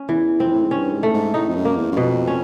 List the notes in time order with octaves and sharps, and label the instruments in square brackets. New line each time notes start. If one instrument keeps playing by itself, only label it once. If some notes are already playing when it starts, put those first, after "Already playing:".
Already playing: [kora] C#4
[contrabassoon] E2 [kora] E3
[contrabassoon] F2 [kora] C4
[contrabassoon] A2
G#2
[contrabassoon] G2 [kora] C#4
[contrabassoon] G#2
[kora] A3
[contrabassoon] G#2
[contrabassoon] A2 [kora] D#4
[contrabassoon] F2
F#2
[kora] A#3
[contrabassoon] E2
F#2
[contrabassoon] F2 [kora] B2
[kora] C#4